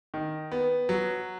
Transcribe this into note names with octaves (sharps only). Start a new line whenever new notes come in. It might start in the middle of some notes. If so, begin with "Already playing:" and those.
D#3
B3
F#3